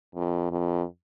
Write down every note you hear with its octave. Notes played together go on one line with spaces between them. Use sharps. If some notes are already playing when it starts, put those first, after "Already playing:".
F2
F2